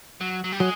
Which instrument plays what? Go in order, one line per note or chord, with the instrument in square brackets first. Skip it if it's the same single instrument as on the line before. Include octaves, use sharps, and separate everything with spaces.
[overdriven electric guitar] F#3
F#3
G3
[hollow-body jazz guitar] F#3 [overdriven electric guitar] G#3